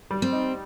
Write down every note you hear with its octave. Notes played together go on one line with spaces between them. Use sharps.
G3
C4
D#4